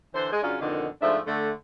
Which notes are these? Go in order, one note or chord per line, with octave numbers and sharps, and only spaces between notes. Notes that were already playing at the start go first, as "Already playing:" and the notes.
D3 E3 C5
G#3 G#4
F#2 C#3 C#4 D4 F4
F2 B2 D3 D#3
G#2 F3 A3 D4 E5
D3 A3